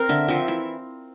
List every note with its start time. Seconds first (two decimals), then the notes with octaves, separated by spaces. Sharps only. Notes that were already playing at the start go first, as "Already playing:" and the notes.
Already playing: C4 A#4
0.09 D3 E5
0.28 F3 C4 E5
0.48 E3 E5